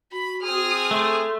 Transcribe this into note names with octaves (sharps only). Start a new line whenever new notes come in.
F#4 B5
C4 G#4 D#6 F6
A3 C6